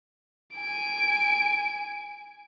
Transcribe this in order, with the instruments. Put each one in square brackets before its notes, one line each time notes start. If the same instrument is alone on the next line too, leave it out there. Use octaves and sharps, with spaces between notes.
[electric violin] G#5 D7